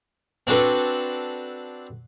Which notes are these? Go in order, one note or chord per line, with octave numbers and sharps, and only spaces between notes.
C4 D4 F#4 A4 B4